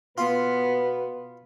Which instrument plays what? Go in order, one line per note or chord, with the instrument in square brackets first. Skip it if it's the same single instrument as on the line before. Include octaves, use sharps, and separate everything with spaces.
[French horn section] B2 B4 [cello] B3 [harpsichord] F4